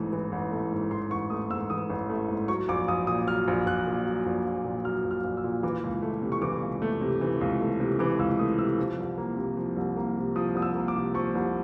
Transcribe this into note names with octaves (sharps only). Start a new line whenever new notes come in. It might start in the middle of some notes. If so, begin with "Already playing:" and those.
Already playing: A1 G#2 E3 A3
E3
A1
A3
G#2
E3 C6
A1 C#6
A3 D#6
G#2 E6
E3 D#6
A1
A3
G#2
F#3 C#6
A#1 D6
A#1 D#6
A#2 D#6
F#3 F6
A#1
A#1 F#6
A#2
F#3
A#1
A#1
A#2
F#3 F6
A#1
F6
A#1
E6
A#2
E3 D6
C#2
A3
C3
C#6
E3 D6
C#2
A3
C3
E3
C#2
A3
C3
E3 D6
C#2 E6
A3 D#6
C3 E6
F3
C2
A#3
C3
F3
C2
A#3
C3
F3 D#6
C2 D#6
E6
A#3
D6
C3
F3 C#6
C2